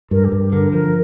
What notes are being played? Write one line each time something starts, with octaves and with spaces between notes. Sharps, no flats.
G2 A#4
G4
G2
G4
D3 A#4
F3 A#4